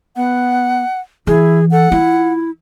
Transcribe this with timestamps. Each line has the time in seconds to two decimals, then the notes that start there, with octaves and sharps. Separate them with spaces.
0.16 B3 F#5
1.27 E3 E4 G#4
1.72 A4 F#5
1.92 E4 F4